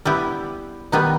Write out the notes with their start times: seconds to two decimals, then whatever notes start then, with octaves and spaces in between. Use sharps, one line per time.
0.05 G3 B3 E4 G4
0.92 D#3 G3 B3 D#4